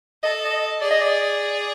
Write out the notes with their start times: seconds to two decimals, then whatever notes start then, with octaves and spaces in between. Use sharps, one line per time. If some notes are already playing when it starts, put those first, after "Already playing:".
0.23 A4 D#5
0.45 D#5
0.82 G#4 D5
0.91 D#5
1.01 D5